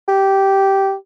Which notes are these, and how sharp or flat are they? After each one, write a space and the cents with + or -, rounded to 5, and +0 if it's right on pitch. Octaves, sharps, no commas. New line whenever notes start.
G4 -10